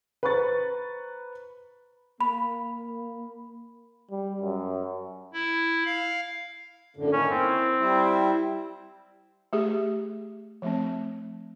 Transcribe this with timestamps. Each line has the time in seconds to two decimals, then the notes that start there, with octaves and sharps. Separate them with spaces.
0.23 B4 C5 A#5 C#6 A6
2.21 A#3 B5
4.11 G3
4.41 F#2
5.33 E4
5.85 F5
6.97 F#2 A2 D3
7.13 D#3 A#3 C#4 D#4
7.31 C4 E4
7.79 G3 E4
9.53 A3 G4 G#4
10.62 F3 A3 C4